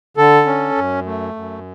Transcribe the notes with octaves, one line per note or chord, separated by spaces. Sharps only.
D3 A4
C#4
F#2
A3
F#2